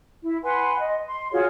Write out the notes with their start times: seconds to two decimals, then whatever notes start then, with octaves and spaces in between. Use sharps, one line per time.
0.22 E4
0.43 B4 F#5 G#5 C6
0.78 D#5
1.06 C6
1.31 F4 F#4 G#4 C#5